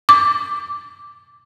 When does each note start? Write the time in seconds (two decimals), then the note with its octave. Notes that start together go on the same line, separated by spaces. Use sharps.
0.09 D6